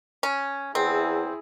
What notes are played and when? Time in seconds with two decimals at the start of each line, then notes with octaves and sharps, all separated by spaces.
0.23 C#4
0.75 E2 C4 E4 G#4